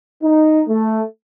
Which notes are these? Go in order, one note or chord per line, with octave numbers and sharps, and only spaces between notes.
D#4
A3